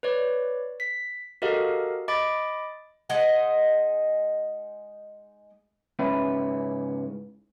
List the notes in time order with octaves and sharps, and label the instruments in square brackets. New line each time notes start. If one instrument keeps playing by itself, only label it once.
[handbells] B4 C#5 D5
B6
F#4 G4 A4 A#4 D#5 F5
D#5 B5 D6 A6 D7
[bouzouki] G#3 D#4 D#5 F#5
[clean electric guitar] G#2 C#3 C#4 E4 B4